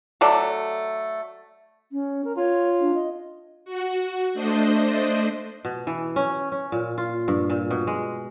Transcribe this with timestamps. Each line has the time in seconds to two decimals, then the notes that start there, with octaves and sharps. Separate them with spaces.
0.21 F#3 A3 A4 D5
1.92 C#4
2.25 A#4
2.37 F4 C#5
2.81 D4
2.94 D#5
3.65 F#4
4.33 A3 D4 C5 D#5
5.65 B2
5.87 E3
6.16 C#4
6.52 C#4
6.72 A#2
6.98 F4
7.28 G2
7.50 A#2
7.71 B2
7.87 G#3